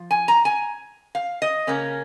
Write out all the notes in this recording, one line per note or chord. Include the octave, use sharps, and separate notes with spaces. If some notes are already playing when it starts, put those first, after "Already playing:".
Already playing: F3
G#5
A#5
G#5
F5
D#5
C#3 A#3 C#4